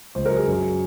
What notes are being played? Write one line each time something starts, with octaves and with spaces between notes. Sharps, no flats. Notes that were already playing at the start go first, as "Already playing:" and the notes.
C#2 C5
A#4
F#3
G#4
F#2